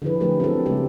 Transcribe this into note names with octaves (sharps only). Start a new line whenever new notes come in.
D3 F3 E4 G#4 B4
F#3 A3 G4 G#4 A#4 B4
C4 E4 F#4 G#4 A4
C#3 G#3 A3 G4 A#4